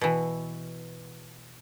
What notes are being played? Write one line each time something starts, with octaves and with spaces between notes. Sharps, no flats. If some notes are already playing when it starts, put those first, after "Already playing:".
B2 E3